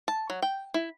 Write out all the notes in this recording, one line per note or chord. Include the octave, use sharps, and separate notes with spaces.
A5
F#3
G5
E4